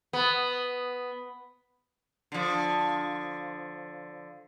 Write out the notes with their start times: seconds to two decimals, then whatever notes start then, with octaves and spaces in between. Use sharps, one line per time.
0.13 B3
2.32 D3 F3